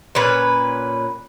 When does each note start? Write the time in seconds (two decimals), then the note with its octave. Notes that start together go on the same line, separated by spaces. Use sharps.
0.15 A#2 C#4 B4